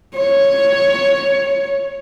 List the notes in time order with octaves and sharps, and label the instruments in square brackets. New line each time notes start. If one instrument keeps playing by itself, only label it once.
[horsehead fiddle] C#5